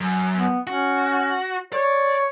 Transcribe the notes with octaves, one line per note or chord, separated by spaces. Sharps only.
F#2
B3
C#4 F#4
C#5 D5